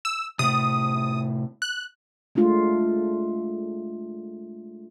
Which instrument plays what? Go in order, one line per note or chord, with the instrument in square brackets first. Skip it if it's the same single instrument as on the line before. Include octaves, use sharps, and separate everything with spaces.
[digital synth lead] E6
[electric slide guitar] A2 C3 [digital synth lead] D#6
[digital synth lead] F#6
[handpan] G#3 A3 D4 F4